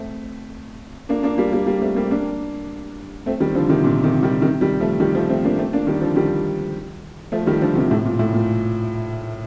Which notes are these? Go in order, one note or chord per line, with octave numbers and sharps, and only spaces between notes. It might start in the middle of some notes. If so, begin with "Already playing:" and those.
Already playing: A3 C4
A#3 D4
A#3 D4
G3 A#3
G3 A#3
G3 A#3
A3 C4
G3 A#3
A#3 D4
A3 C4
D#3 G3
D3 F3
C3 D#3
A#2 D3
C3 D#3
D#3 G3
C3 D#3
D#3 G3
F3 A3
D#3 G3
F3 A3
A3 C4
A#3 D4
A3 C4
A#3 D4
D#3 G3
D3 F3
D#3 G3
F3 A3
D#3 G3
D3 F3
C3 D#3
A2 C3
A#2
A2
A#2